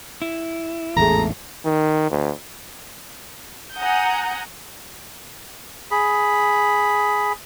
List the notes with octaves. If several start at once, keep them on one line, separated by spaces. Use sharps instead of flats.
E4
A1 E2 G#2 A3 G#4 A#5
D#3
D2
F#5 G#5 A#5 D#6 G6
G#4 B5